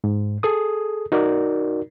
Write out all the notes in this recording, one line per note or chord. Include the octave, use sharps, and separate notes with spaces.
G#2
G#4 A4 D#6
D#4 F#4 A#4 D5